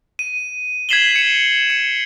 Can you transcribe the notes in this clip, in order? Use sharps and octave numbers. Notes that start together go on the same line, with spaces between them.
D#7
G#6 B6 C7 E7 F#7 G7
C#7 E7
C#7